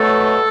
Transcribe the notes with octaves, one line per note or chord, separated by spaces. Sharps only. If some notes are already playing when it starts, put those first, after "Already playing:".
Already playing: B2 F#3 A3 A4